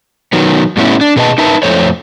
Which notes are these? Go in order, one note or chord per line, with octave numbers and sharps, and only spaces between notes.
D#3 F#3 B3
A2 G3 A3 B3 C#4 E4
D4
B2 G#4 B4 D#5 A5
D#4 A#4 B4 E5 A5
F2 A3 C5 C#5